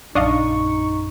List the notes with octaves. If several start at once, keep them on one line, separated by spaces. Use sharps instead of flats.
A#1 F#2 D4 D#4 D#5 F5 C#6